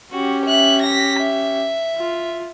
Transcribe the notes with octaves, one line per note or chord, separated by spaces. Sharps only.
C#4 F#4 G4
E5 F#6
A#6 B6
E5
F4